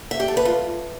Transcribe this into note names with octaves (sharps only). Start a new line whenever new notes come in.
E5
G4
A4
B4
F4